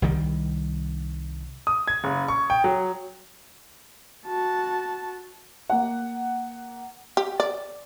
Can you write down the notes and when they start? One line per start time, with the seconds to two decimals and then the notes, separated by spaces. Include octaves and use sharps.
0.02 C2 D#3 G3
1.67 D#6
1.88 G#6
2.04 F#1
2.28 C#6
2.50 G5
2.64 F#3
4.27 F#4 A5
5.70 A#3 F#5
7.17 G4
7.40 D5